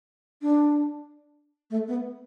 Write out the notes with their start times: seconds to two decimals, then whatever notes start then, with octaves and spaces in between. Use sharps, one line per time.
0.42 D4
1.70 A3
1.88 B3